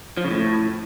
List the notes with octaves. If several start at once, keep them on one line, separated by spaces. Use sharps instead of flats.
F3
C#3
A2